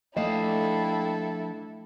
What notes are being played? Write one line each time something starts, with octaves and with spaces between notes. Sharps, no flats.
F3 A3 D4 E4 A4 D#5 F5 G5